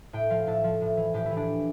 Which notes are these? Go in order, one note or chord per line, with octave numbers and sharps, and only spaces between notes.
A2 G5
F3 F5
A2 A4
F3
A2
E3
A2 G4
E4
E3
D4